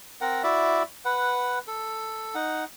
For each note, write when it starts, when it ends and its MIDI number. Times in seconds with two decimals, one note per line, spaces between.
0.21 0.43 60
0.21 0.43 70
0.21 0.43 78
0.43 0.83 64
0.43 0.83 66
0.43 0.83 74
0.43 0.83 76
1.05 1.59 71
1.05 1.59 78
1.68 2.34 69
2.35 2.64 63
2.35 2.64 78